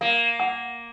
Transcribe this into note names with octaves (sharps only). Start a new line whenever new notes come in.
A#3 F5
F#5